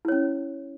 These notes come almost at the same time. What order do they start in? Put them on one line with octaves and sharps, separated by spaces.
E4 C#5 C#4